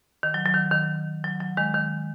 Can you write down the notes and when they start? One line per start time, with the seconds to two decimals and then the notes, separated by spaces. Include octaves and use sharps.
0.23 D#3
0.34 F#3
0.46 F#3
0.54 D#3
0.72 D#3
1.24 F#3
1.40 F#3
1.57 D#3 G#3
1.74 D#3